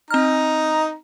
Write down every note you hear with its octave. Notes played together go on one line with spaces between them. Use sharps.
C4 D#4 A#5 F6